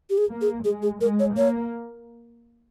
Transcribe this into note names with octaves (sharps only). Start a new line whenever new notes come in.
G4
G#4
A#3
G#4
G#3 G#4
G#4
G#3 A#4
C#5
A#3 C#5